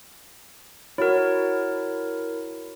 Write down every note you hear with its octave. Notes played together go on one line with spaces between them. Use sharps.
E4 F#4 A#4 C#5